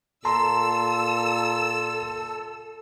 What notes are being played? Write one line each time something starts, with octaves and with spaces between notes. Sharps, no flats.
A#2 A4 A5 A#5 C6 E6